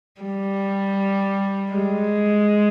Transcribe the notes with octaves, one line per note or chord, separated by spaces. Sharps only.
G3
G#3